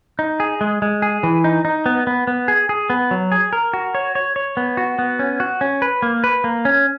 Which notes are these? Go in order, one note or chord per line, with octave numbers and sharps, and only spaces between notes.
D#4
G#4
G#3
G#3
G#4
E3
D#4
D#4
B3
B3
B3
G#4
G#4
B3
F#3
G#4
A#4
F#4
C#5
C#5
C#5
B3
F#4
B3
C#4
F#4
C#4
B4
A#3
B4
A#3
C#4